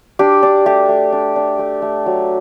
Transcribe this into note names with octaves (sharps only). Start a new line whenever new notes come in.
D4 G4
D4
A3 G4
A3
D4
D4
A3
A3
F#3